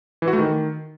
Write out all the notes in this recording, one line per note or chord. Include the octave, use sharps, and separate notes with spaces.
E3
F#4
A3
D#3